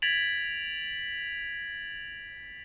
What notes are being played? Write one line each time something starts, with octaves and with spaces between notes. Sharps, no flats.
G#6 A6 B6 D7 F7 F#7